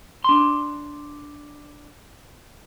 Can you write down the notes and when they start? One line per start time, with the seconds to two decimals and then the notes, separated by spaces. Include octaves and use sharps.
0.24 D4 C6